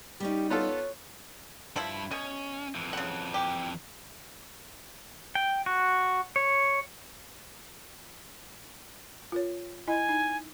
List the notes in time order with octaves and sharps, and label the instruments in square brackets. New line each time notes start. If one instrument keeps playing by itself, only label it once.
[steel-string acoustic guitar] G3 C#4 D#4 [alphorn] G4
[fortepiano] B3 F4 A4 [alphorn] C#5
[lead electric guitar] G2 B5 [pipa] F3 E4
[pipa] B2 [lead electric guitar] C#4
[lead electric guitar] F2 E3
[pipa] C#3 F#5
G4
[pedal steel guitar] G5
F#4
C#5
[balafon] F4 A#4 C#5
[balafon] E4 D#5 B5 [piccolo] G#5
[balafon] D#4